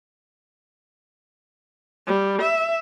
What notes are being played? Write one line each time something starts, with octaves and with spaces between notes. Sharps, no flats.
G3
E5